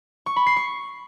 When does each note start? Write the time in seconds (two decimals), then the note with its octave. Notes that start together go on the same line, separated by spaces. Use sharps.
0.26 C#6
0.36 B5
0.46 C7
0.56 C#6